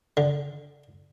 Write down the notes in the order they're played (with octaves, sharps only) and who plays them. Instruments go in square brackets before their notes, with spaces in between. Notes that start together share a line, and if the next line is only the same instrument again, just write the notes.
[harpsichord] D3